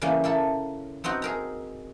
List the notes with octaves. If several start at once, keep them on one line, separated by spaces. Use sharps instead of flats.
C#3 E3 G3 A#3 C#4
A#3 E4 A4
B3 C4 D#4 F#4
G#4 A#4 A#5